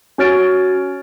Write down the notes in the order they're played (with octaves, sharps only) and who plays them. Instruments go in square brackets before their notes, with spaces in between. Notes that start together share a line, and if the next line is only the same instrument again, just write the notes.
[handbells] C#4 F#4 C#5 F6 A6 D7